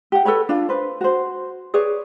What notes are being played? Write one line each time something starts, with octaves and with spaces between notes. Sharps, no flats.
G4 F#5
A4 B4 C#5 B5
D4 F4
B4 C5
F#4 C5
G#4 B4 C#5 D5